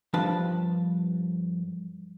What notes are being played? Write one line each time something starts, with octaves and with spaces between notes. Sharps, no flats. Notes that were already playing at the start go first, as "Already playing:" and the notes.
G2 F3 D4 B4 A5